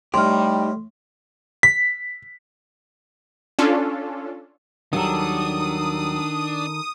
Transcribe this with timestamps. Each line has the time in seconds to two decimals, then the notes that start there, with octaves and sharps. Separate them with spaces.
0.14 A2 G3 D#4 G4 C6 F6
1.63 B6
3.59 C#4 D4 F4 A4
4.93 D#2 D#3 F#3 G3 D4 A4 D#6